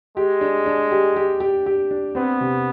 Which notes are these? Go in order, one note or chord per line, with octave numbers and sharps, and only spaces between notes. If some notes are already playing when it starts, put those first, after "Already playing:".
G#3 G4
D4
D4
G4
G4
G4
G4
D4
B3 C4
C3